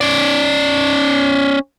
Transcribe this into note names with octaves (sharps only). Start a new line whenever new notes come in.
C#4 D5